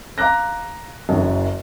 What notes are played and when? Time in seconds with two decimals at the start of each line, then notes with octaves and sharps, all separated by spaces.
0.18 F5 A#5 D6 F#6 A#6
1.09 F#1 F#2